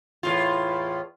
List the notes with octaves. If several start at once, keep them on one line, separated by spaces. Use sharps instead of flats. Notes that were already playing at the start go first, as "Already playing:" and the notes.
E2 A2 F4